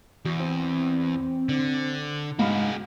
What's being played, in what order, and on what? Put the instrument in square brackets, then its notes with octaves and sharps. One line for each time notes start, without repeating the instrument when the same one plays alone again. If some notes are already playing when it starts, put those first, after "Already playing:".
[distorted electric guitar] E2 [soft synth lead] F#4
[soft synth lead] C4
[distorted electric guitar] D3
[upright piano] G#2 B5 [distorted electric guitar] F#4 G#4 [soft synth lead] F5